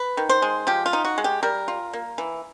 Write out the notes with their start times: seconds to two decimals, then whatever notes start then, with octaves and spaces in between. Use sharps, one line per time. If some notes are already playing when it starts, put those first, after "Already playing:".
Already playing: B4
0.17 D#3
0.29 C5
0.42 G#3
0.67 F3 G4
0.86 F4
0.93 D#4
1.05 F#4
1.18 G#3
1.24 G4
1.43 G3 A#4
1.68 F4
1.93 A#3
2.18 E3